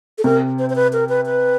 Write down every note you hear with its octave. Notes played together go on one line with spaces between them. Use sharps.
A4
C3 A#4
C5
C5
B4
A#4
B4
B4